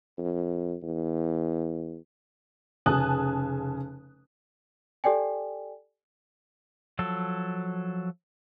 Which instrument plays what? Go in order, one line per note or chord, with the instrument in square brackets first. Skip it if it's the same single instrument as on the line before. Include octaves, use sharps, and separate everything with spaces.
[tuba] F2
E2
[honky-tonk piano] F1 C#3 G#5 A5 D#6 F#6
[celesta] G4 A4 D5 G5 G#5
[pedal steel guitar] F3 F#3 A4